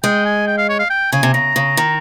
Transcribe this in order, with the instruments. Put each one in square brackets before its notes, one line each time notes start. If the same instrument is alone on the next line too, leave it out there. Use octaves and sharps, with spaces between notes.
[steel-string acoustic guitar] G#3 [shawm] G5
[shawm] G#5
G5
F5
C#5
F5
G5
[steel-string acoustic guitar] C#3 [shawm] G#5
[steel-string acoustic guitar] C3
[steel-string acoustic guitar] C#3 [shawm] A#5
[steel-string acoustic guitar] C#3
D#3